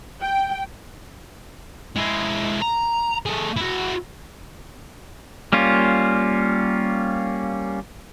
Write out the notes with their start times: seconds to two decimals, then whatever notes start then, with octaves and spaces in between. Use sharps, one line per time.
0.22 G5
1.96 G#3 E4
2.62 A#5
3.26 A3 G#4
3.57 E4 F#4
5.53 G3 A#3 C#4 F4